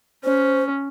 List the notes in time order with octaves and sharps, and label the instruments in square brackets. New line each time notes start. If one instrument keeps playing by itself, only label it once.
[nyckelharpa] C#4 [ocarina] C5